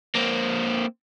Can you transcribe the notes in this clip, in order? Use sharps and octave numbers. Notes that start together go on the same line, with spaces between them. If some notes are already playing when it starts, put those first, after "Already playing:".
A#3 C4